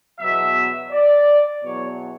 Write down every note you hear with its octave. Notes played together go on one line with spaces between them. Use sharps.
E2 B2 F#3 E5
D5
E2 B2 F#3 C#5